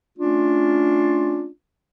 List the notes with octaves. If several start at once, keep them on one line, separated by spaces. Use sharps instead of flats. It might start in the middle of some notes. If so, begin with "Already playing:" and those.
A3 C#4 D4 F4